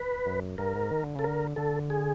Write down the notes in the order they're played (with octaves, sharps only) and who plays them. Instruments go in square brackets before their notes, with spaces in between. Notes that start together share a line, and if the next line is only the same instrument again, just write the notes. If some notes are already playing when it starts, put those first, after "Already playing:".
Already playing: [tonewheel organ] B4
[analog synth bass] F#2
[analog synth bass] G2 [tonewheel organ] A#4
[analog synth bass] G#2
D#3
D3
[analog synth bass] C#3 [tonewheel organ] A4
[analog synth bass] D3 [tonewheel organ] A#4
[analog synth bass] D3 [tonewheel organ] A4
[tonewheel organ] G#4